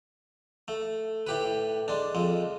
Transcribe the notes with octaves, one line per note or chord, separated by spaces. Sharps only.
A3
A2 G4 B4
G#3 D4
F2 G#3